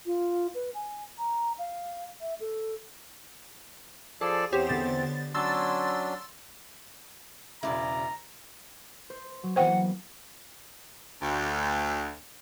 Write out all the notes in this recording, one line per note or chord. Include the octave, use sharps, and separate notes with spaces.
F4
B4
G#5
A#5
F5
E5
A4
F3 G#4 A4 D5
E2 C4 G4 C5 C#5
D3 B3 A6
F#3 C#4 D4 C6 E6 A6
E1 C#3 E4 D5 A#5
C5
F#3
E3 A#3 B3 C5 F#5 G5
D2